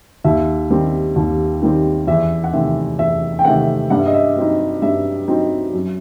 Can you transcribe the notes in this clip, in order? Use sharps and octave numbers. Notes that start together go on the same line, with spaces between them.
D#2 E5
D#3 G3 C4
D#2
D#3 G3 C4
E2 E5
F#5
C3 D#3 A3 C4 E5
E2 E5
G5
C3 D#3 A3 C4 F#5
G2 F#5
E5
D#5
E5
F#3 C4 D#4
G2 E5
F#3 C4 D#4
F#2